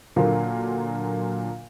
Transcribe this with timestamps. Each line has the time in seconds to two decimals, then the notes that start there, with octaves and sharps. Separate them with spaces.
0.16 A#2 D3 F#3 A#3 F4